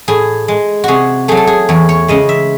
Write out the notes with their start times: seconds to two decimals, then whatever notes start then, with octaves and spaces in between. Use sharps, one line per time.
0.08 A2 G#4
0.48 G#3
0.84 C3 F#4 G#4
1.28 F#3 A3 G#4
1.37 A4
1.47 G#4
1.69 E2 C#5
1.89 C#5
2.08 C#3 G#3 D#5
2.29 E5